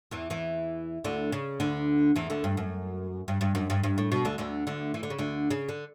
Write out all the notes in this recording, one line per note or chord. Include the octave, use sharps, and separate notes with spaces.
E2 E3
E2 E3
D2 D3
C#3
D2 D3
E2 E3
D2 D3
G2
F#2
G2
G2
F#2
G2
G2
A2
B2
D2 D3
D2 D3
D2 D3
E3
D3
C#3
D2 D3
C#3
D3